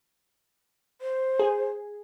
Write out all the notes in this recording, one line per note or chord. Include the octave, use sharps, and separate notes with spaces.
C5
G#4